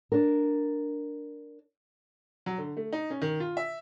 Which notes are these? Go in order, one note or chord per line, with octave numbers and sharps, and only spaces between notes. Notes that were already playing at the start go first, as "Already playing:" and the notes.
D4 A#4
F#3
D3
A3
D#4
C#4
D#3
F4
E5